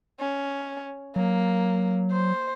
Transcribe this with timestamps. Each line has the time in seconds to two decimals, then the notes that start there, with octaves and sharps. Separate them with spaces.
0.20 C#4
1.16 F#3 A#3
2.12 C5